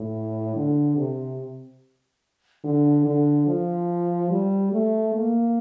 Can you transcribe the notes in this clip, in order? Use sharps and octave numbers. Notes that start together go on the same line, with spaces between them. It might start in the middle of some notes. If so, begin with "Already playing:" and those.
Already playing: A2
D3
C3
D3
D3
F3
G3
A3
A#3